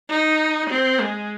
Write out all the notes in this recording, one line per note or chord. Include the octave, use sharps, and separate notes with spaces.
D#4
C4
G#3